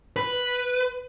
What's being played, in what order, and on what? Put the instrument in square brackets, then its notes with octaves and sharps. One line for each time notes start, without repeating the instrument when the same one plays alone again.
[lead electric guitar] B4